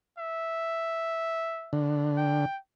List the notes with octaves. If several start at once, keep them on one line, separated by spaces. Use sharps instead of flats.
E5
D3
G5